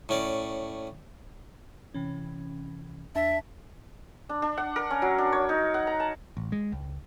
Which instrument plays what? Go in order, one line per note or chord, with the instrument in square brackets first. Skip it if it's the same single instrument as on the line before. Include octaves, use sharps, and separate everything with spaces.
[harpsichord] A2 C#4 D5
[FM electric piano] C3 E3 C#4
[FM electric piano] E2 D4 A5 [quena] E5
[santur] D4
D4
F#5
A#4
C#4
F#3
D4
C#5
D#4
F#5
A#5
A5
[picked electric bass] A1
G#3
C#2